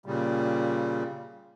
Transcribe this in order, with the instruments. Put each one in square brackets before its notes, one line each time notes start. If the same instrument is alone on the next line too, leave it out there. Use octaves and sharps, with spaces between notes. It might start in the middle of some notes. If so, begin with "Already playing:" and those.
[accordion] A#2 C#3 G3